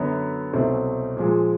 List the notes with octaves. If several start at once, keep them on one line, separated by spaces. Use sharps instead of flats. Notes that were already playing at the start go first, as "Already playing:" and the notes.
Already playing: F#2 D3 F#3 B3
C2 B2 F#3 A3 C4
A#2 F3 G#3